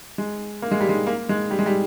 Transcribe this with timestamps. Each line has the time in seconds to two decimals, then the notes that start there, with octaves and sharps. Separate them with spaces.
0.18 G#3
0.62 A#3
0.71 G#3
0.80 G3
0.89 G#3
1.07 A#3
1.29 G#3
1.51 G3
1.59 G#3
1.66 G3